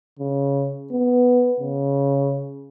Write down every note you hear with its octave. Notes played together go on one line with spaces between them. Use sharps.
C#3
B3
C#3